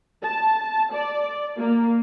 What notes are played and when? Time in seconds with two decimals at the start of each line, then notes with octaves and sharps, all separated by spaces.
0.23 A5
0.93 D5
1.58 A#3